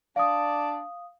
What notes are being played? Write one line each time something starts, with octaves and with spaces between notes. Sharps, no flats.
D4 D5 F5 A5 D#6